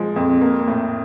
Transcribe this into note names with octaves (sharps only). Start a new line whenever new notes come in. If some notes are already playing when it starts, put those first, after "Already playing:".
Already playing: F3 G#3
F2
A#3
A2